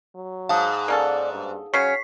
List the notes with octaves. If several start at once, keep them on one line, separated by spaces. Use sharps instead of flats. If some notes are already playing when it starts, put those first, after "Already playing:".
F#3
G#2 F5 A5 D#6
A#3 C#4 A4 D5
G2
C#3 F#3 C#4 C#5 C#6 B6 C7